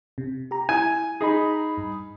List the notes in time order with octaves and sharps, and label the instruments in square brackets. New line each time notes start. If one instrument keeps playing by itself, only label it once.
[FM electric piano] C3
G4 A#5
[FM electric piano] E4 [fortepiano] G#5
[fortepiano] D#4 G#4 [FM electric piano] A#5 B5
[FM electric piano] G2